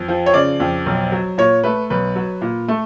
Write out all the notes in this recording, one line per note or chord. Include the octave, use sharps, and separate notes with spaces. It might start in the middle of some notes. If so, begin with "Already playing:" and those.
Already playing: F2
F3
C#5
C#3 D5
F2
B1
F#3
A#2 C#5
A3 B4
B1 B4
F#3
A#2
A3